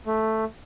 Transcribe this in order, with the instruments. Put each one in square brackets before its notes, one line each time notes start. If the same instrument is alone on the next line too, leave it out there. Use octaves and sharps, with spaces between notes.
[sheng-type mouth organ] A3